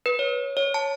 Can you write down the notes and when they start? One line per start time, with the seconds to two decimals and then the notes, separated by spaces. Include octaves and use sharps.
0.06 B4
0.19 C#5
0.57 C#5
0.74 A5